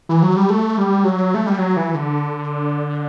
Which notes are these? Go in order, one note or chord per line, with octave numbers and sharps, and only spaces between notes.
E3
F#3
G3
A3
G3
F#3
A3
G3
F#3
E3
D3